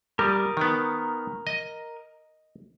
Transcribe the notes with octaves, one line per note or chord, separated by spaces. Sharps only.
G3 A#4 D6 D#6
D#3 B3
D#5